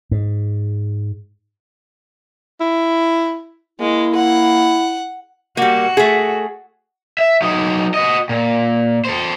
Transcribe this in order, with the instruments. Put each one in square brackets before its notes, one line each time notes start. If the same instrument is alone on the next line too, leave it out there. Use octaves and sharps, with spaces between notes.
[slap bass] G#2
[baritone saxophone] E4
[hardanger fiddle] G#3 [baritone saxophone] A#3 [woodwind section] E4
[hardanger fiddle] F#5
[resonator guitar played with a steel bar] G3 A#3 [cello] F#4
[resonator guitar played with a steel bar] A3 G#4
[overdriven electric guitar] E5
F#3 D#4
F#4 D#5
A#2
A4 C5